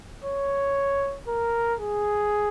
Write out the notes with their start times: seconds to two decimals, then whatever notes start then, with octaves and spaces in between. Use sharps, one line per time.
0.24 C#5
1.28 A#4
1.80 G#4